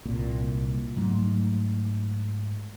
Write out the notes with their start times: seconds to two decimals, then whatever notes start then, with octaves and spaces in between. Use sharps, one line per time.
0.05 C2 A#2
0.96 G#2 F#3 A3